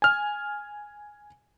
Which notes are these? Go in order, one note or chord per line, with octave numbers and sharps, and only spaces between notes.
G#5 F6